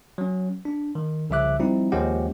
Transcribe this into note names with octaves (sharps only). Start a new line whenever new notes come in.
F#3 C#4
D4
D#3
C2 C#3 F3 E5 D6 F#6
F3 G3 C4 D#4 E4
D#2 F3 G#3 C#4 G4 F#5